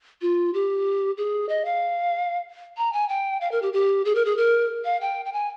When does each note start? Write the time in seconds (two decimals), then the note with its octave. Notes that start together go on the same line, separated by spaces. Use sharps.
0.22 F4
0.54 G4
1.17 G#4
1.49 D#5
1.65 F5
2.77 A#5
2.93 G#5
3.09 G5
3.41 F5
3.52 A#4
3.62 G4
3.73 G4
4.05 G#4
4.15 A#4
4.25 G#4
4.37 A#4
4.85 F5
5.01 G5
5.25 G5
5.33 G#5